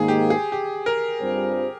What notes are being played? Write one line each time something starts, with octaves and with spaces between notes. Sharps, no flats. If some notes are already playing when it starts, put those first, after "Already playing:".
Already playing: G#2 D#3 A#3 G#4
G4
G#4
G4
A#4
G2 G3 C4 F4 C5